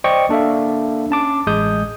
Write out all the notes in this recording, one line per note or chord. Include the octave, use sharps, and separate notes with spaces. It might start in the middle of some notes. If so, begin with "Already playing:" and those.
C5 D5 D#5 G5 C#6
A#3 D4 A4 E5 F5
C#4 A5 D6
A1 G#3 D#6 G6